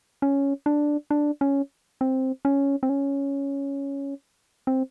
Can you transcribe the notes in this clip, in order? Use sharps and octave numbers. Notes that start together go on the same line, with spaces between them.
C#4
D4
D4
C#4
C4
C#4
C4
C#4
C4